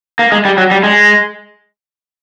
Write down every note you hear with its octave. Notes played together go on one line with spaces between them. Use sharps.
A#3
G#3
G3
F#3
G3
G#3